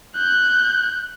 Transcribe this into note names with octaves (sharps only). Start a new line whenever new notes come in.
F#6 G6